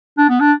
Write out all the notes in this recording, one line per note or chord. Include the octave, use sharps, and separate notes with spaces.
D4
B3
D4